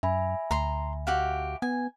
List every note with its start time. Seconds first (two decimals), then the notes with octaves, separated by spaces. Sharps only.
0.03 F#2 E5 G#5 B5
0.51 D2 A#5 C6
1.07 F#4 G4 F5
1.62 B3 G#5